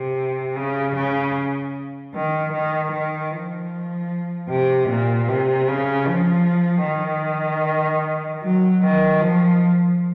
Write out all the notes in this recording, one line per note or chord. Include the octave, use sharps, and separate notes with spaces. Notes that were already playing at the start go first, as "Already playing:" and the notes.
Already playing: C3
C#3
C#3
D#3
D#3
D#3
F3
C3
A#2
C3
C#3
F3
D#3
F#3
D#3
F3